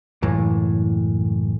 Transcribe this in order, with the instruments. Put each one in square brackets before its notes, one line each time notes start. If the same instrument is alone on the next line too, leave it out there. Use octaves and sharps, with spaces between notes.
[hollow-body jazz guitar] C#2 F#2 A2 E3